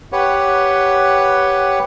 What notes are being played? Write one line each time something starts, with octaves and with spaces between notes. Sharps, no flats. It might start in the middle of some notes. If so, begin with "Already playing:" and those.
G4 B4 C#5 F#5